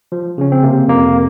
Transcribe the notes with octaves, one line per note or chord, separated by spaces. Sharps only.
F3
C#3 C#4
C4
C3 A#3
F2 A#3